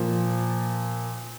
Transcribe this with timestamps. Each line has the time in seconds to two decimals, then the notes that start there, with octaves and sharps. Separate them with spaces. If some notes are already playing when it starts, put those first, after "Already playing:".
Already playing: A#2 F3